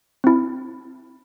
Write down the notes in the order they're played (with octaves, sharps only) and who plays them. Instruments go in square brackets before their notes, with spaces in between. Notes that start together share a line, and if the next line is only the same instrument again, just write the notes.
[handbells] C4 E4